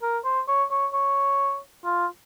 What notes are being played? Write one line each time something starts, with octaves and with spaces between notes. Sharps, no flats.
A#4
C5
C#5
C#5
C#5
F4